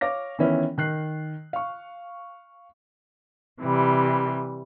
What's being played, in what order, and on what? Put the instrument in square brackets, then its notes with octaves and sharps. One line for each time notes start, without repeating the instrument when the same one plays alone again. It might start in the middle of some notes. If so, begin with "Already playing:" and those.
[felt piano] C#5 F5 D6 A#6
D#3 E3 B3 C#4 E4
D#3 F#6 C7
F5 C#6
[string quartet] C3 E3 G3